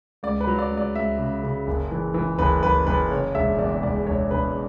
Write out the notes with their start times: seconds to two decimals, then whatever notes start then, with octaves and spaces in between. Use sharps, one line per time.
0.23 C#2 D5
0.41 B4
0.47 F#3
0.58 D5
0.71 C#2
0.77 D5
0.95 C#2 E5
1.19 C#3
1.43 C#3
1.67 F#1
1.91 E3
2.14 E3
2.39 F#1 B4
2.63 F#1 B4
2.87 F#1 B4
3.11 C#3 C#5
3.35 E1 E5
3.58 E2 D5
3.83 E1 D5
4.06 E1 C#5
4.31 E1 B4